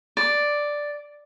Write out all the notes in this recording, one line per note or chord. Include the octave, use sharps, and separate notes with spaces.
D5